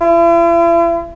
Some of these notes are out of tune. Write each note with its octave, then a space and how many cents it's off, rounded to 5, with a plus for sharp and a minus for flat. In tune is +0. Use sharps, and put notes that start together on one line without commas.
E4 +45